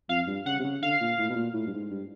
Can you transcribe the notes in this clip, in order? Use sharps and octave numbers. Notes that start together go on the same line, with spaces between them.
F2 F5
G2
C#3 F#5
C3
C#3
D3 F5
A#2
A2
B2
A#2
A2
G2
G#2
G2